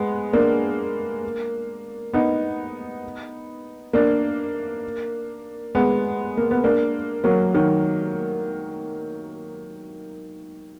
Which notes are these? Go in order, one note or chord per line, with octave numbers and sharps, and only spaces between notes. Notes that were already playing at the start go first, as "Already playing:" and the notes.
Already playing: G#3 B3
A#3 D4
B3 D#4
A#3 D4
G#3 B3
A#3
B3
A#3 D4
F#3 A#3
D#3 F#3